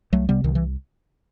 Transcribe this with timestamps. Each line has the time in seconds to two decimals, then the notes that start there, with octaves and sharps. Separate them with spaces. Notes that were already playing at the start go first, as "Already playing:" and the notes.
0.12 C2 F#3 A3
0.29 C3 G3 B3
0.44 C2 D#3
0.55 E3